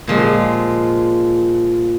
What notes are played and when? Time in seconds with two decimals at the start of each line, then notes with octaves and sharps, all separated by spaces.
0.08 A#2 F3 G#3